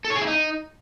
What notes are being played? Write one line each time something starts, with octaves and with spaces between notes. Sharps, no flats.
A4
C#5
G#4
E4
D#4